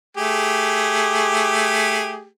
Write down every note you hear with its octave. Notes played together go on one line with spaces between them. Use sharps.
A3 G4 G#4